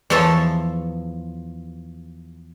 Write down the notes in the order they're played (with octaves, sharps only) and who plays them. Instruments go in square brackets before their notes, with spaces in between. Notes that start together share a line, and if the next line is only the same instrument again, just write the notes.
[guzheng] E2 F3 A4 C#5 E5 A5